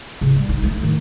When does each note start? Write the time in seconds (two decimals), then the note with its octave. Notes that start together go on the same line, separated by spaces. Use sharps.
0.21 C#3
0.36 G3
0.49 D#4
0.64 A3
0.83 D#3